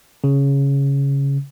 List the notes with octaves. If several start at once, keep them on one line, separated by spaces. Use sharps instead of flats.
C#3